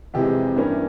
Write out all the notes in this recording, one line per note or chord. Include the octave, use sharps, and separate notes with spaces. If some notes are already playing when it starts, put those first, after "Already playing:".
F2 C3 E3 G#3 G4
G2 E3 A#3 C#4